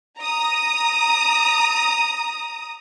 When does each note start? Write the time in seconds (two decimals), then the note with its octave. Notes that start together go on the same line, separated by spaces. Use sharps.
0.19 A#5 D#6